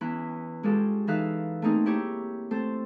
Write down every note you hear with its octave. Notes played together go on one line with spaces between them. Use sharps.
E2 C#4 E4 B5 F#6
G#3 C#4 F4 G4 A4
E3 D#4 A4 E5 F5 F#6
A3 A#3 C4 D#4 G#4 A#4
E4 G4 C#5 A#5
A3 C4 A4 C5